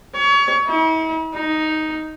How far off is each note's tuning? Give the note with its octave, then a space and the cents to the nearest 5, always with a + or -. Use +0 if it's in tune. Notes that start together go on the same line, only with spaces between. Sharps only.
C#5 +30
E4 -45
D#4 +5